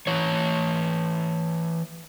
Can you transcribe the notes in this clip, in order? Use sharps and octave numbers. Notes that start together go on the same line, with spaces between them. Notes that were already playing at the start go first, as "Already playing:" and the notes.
E3 C#5